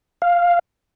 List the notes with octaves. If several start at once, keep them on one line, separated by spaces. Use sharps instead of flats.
F5